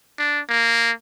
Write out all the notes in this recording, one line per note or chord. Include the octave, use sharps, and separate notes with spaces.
D4
A#3